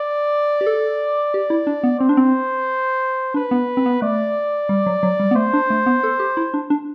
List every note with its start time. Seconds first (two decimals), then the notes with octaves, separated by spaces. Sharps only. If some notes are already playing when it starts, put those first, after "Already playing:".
Already playing: D5
0.61 G4
0.67 A4
1.34 G4
1.50 E4
1.67 D4
1.84 B3
2.00 C4 C5
2.09 D4
2.17 C4
3.34 D4 B4
3.51 B3
3.77 C4
3.86 B3
4.02 A3 D5
4.69 G3
4.86 F#3
5.03 F#3
5.20 G3
5.31 B3
5.36 A3 C5
5.53 D4
5.70 A3
5.86 B3
6.03 A4
6.19 G4
6.37 E4
6.54 D4
6.70 D4